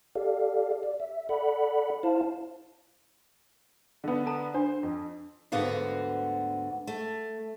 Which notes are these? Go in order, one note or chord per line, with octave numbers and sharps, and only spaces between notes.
G4 A4 D5 F5
D5
E5
A4 D5 F#5 B5
E4 C5 F5 A5
D3 B3
A4 A#5
D4 C5
F2
D2 G#2 D3 B3 F#4 F5
A3